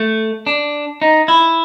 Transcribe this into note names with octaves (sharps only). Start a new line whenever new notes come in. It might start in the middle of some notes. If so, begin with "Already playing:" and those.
Already playing: A3
D4
D#4
E4